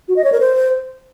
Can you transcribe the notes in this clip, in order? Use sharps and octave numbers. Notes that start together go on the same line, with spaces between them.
F#4
D#5
C#5
A#4
C5